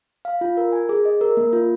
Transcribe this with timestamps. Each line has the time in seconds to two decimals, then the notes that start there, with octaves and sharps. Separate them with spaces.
0.25 F5
0.41 F4
0.57 A#4
0.72 G#5
0.89 G#4
1.05 D#5
1.21 A#4
1.37 A#3
1.53 F4